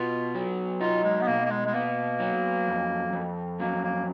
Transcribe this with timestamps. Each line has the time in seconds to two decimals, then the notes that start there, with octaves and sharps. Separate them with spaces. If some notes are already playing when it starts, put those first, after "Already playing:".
Already playing: B2 B3 F4
0.35 F#3
0.80 D#4 F4
1.04 G#3
1.21 B3
1.28 B2 A#3
1.45 A#3
1.50 G#3
1.66 G#3
1.74 A#3 B3
2.20 F#3
2.67 F2
3.13 F2
3.60 F#3 A#3
3.84 A#3